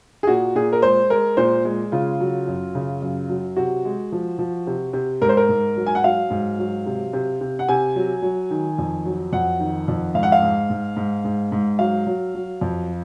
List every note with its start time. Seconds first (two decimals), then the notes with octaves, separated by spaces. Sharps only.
0.23 G#4
0.27 A#2 F#4
0.55 A#2 G#4
0.72 A#4
0.82 G#3 C5
1.10 G#3 A#4
1.37 A#2 C5
1.65 G#3
1.92 C#3 F4
2.20 F#3
2.48 F#2
2.75 C#3
3.02 F#2
3.29 F#3
3.57 C3 F#4
3.85 G#3
4.12 F3
4.39 F3
4.67 C3
4.93 C3
5.21 G#2 A#4
5.29 C5
5.37 A#4
5.49 G#2
5.76 F#3
5.86 G#5
5.95 F#5
6.03 F#3 F5
6.30 G#2
6.59 F#3
6.86 C3
7.13 C3
7.41 C3
7.59 F#5
7.68 C3 G#5
7.96 F#3
8.22 F#3
8.50 D#3
8.78 F2
9.05 F#3
9.33 F2 F#5
9.59 D#3
9.88 F2
10.15 G#2 F5
10.23 F#5
10.32 F5
10.42 G#2
10.70 G#2
10.97 G#2
11.24 G#2
11.52 G#2
11.79 F#3 F5
12.07 F#3
12.35 F#3
12.61 F2